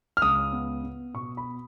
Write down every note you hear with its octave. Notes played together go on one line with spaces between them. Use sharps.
F6
C#2 D#6
B3
B3
B2 C#6
B5